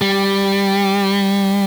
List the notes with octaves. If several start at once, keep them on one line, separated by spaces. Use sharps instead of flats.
G3